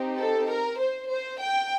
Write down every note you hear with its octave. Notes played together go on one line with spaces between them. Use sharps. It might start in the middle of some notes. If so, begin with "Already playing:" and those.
Already playing: C4 D#4 G4
A4
A#4
C5
C5
G5